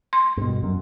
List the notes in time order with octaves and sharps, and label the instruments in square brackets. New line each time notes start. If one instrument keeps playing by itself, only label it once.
[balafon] C6
[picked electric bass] G2 B2
F#2